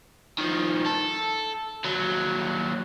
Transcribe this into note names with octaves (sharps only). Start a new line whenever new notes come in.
D#3 F3
A4
D#2 F#3